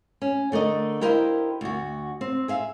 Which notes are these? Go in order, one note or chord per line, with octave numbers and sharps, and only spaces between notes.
C#4
D3 A3 A#4 D#5
E4 G4 A#4 C5 D#5 F5
D2 F#4
C4
G#4 E5 F5